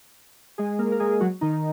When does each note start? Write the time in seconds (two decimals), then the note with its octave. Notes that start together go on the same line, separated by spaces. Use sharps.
0.58 G#3 G#4
0.79 A#3 A#4
0.92 A#4
1.00 G#3 G#4
1.20 F#3 F#4
1.41 D#3 D#4